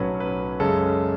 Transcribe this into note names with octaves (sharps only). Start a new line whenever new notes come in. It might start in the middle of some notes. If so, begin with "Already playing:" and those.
Already playing: B1 A2 F#3 A3 C#4 B4
B4
F#2 C#3 G#3 C#4 A4